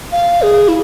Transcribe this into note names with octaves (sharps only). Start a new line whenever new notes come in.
F5
G#4
E4